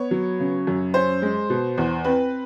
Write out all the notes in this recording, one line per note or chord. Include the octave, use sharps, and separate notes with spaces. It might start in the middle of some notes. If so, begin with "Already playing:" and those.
Already playing: B3 C#5
F#3
C#3
F#2
C#4 C5
G#3
B2
E2
C4 B4